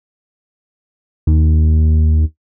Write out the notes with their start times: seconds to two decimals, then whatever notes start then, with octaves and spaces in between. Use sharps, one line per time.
1.27 D#2